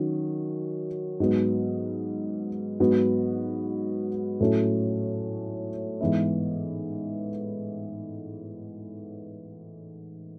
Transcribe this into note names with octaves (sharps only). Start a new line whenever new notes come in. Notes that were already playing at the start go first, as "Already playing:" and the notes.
Already playing: D#3 F#3 C#4 F#4
G#2 F#3 B3
G#2 F#3 B3 F#4
A2 F#3 A3 C#4
G#2 E3 B3 E4